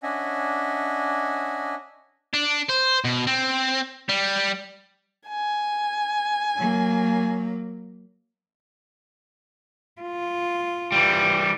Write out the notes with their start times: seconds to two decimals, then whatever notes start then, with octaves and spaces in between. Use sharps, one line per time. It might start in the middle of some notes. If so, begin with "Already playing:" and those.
0.03 C#4 D4 D#5 E5 F#5 G#5
2.34 D4
2.70 C5
3.05 B2
3.27 C4
4.09 G3
5.28 G#5
6.57 F#3 A#3
10.02 F4
10.92 E3 G3